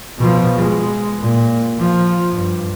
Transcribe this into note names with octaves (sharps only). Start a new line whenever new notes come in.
B2 F3
G#3
A#2
F3
G2